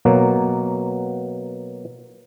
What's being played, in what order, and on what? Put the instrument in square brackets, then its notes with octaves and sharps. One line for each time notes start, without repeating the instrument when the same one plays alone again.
[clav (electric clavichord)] B2 F#3 A#3